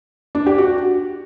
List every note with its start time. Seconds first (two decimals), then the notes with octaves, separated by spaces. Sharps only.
0.35 D4
0.46 G4
0.58 F#4